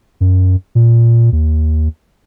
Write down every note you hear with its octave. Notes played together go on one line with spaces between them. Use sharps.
F#2
A#2
D#2